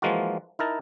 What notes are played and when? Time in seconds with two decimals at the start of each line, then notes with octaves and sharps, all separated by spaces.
0.02 E3 F3 G#3 A#3 F4 F#4
0.59 D#4 E4 A#4 A5